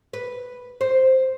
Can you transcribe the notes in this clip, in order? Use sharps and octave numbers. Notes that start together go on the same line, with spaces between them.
B4
C5